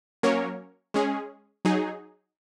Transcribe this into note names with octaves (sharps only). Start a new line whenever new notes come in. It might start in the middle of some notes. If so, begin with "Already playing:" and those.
F#3 A#3 C#4 A#4 C#5
G#3 C#4 G#4
F#3 D#4 G#4